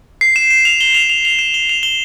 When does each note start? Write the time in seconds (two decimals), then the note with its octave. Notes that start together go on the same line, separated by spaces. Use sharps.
0.21 C7
0.36 E7
0.50 E7
0.65 F7
0.81 G7
0.95 F7
1.10 F7
1.25 F7
1.39 E7
1.54 G7
1.69 F7
1.83 G7